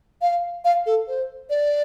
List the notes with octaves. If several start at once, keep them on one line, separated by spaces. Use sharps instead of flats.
F5
F5
A4
C5
D5